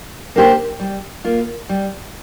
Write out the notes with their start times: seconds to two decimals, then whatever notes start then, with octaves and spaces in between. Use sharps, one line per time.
0.36 A#3 D4 G4 C5
0.80 G3
1.24 A#3 F4
1.69 G3